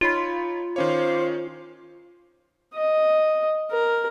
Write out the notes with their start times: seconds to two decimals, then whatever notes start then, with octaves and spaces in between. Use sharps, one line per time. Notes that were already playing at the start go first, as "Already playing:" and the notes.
0.01 D#4 F4 C#5 B5
0.76 D#3 C#4 C5 C#5 F5 D6
2.74 D#5
3.71 A#4